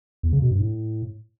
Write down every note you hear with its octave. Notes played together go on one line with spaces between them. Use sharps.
E2
C#3
B2
G2
A2